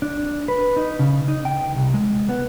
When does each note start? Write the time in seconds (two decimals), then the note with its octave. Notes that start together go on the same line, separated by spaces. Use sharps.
0.02 D4
0.48 B4
0.76 D#4
0.99 C#3
1.28 D#4
1.45 G5
1.75 C2
1.94 G#3
2.29 B3